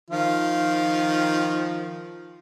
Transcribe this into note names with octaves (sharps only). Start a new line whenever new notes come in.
D#3 F3 F4